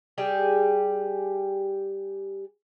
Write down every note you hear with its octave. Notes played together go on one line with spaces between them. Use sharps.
G3 G4 G#4